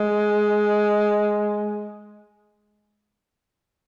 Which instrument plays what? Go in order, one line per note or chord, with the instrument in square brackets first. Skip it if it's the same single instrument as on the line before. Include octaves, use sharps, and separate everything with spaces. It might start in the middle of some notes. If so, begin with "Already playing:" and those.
Already playing: [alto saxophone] G#3